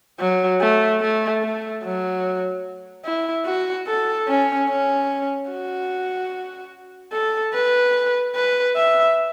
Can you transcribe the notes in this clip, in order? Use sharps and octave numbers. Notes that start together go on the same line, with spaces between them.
F#3
A3
A3
A3
F#3
E4
F#4
A4
C#4
C#4
F#4
A4
B4
B4
E5